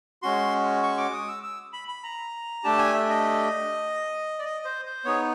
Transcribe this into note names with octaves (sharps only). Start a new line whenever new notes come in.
G#3 C#4 F#4 C6
C#6
D6
D#6
E6
E6
B5
B5
A#5
A3 D4 G4 A5
G#5
E5
D#5
D5
D#5
C5
C5
B3 D#4 G#4 C#5